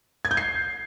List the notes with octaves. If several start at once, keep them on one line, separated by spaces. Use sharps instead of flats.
G#6
G6
C7